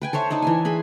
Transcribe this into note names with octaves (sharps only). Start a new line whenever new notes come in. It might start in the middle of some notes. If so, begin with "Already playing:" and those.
B4 G5 G#5
A4 C5 C#5 E5
D4 D#4 A4 D#5
E3 E5 G#5
G#4 B5 C6